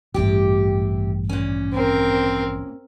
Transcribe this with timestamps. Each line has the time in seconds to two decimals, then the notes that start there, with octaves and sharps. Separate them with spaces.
0.14 D#1 A1 G2 C3 G4
1.29 A#2 C#4
1.74 C4 A#4